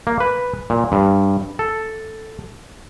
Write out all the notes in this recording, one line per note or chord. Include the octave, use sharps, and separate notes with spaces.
A#3
B4
A#2
G2
A4